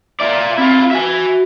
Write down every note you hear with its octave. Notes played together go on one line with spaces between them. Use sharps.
F4 D5 E5
C4 E4 F4
F#4 E5 G#5